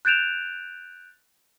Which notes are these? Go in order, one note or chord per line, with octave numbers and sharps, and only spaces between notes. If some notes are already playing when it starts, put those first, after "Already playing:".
F#6 G6 A6 D7 E7 F7